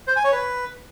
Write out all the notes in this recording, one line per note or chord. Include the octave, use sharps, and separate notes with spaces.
C5
G#5
C#5
B4